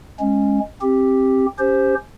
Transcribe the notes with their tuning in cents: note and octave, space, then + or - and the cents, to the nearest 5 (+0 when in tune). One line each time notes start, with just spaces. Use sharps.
G#3 +0 C#4 -10
C4 +15 G4 +0
C#4 +10 G4 +15 C5 +0